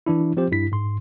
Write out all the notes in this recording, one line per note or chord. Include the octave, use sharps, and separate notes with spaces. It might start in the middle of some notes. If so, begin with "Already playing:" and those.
E3 D4 E4
F3 C4 G4 C5
G2 E4 B6
G#2 C6